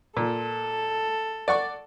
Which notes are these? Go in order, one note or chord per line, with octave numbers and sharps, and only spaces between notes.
A#2 A4
D5 F#5 C#6